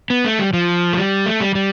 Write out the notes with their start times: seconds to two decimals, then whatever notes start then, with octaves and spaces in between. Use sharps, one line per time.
0.10 B3
0.25 A3
0.39 G3
0.53 F3
0.93 A3
0.97 G3
1.26 A3
1.41 G3
1.55 G3